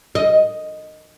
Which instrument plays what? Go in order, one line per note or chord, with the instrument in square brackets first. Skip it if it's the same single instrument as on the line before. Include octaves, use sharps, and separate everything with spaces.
[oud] D#5